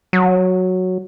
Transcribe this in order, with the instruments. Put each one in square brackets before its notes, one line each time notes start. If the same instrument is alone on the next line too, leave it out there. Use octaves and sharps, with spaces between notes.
[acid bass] F#3